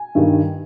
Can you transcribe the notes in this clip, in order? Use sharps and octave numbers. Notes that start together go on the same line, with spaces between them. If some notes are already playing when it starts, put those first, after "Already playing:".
Already playing: G#5
G2 D#3 G3